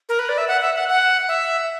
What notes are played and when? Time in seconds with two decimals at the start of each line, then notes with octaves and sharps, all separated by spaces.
0.09 A#4
0.19 B4
0.29 D5
0.38 E5
0.48 F#5
0.62 E5
0.76 F#5
0.89 F#5
1.28 E5